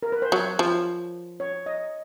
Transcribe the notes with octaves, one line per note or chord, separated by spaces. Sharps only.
A#4
B4
C5
F#3 C#5
F3
C#5
D#5